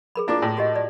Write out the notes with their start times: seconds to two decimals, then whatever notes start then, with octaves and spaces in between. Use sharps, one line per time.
0.16 G#4 A#4 B5
0.28 A#3 D4 E4 F4 D6
0.42 A2
0.57 F#4 G4 D#5
0.76 D5